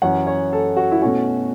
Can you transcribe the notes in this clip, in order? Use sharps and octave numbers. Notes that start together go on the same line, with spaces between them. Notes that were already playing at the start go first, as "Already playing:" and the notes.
F#2 E3 C#4 F#5
C#5
A4
F#4
E4
B2 A3 C#4 F#4